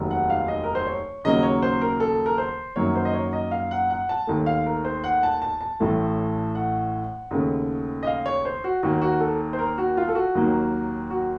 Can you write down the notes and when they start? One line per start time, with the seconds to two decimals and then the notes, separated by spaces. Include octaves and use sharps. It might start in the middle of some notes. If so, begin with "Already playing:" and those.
Already playing: F1 D#2 D#3 F#3
0.11 F#5
0.30 F5
0.48 D#5
0.64 A#4
0.75 C5
0.87 C#5
1.24 D#2 C#3 F#3 A#3 D#5
1.43 C#5
1.62 C5
1.81 A#4
2.00 A4
2.26 A#4
2.38 C5
2.76 F#2 D#3 F#3 A#3 C#5
2.95 C5
3.05 D#5
3.14 C#5
3.33 D#5
3.51 F5
3.71 F#5
3.90 F#5
4.09 A5
4.27 D#2 D#3 A3
4.46 F5
4.66 A#4
4.85 C5
5.04 F#5
5.23 A5
5.42 A5
5.61 A5
5.80 A1 A2 A3
6.55 F#5
7.31 D#2 C#3 A3
8.03 D#5
8.07 F5
8.26 C#5
8.45 C5
8.64 F#4
8.83 D#2 D#3 A#3 F#4
9.02 F#4
9.20 A4
9.53 C5
9.59 A#4
9.78 F#4
9.97 F4
10.08 A4
10.15 F#4
10.35 D#2 D#3 F#3 A#3
11.10 F#4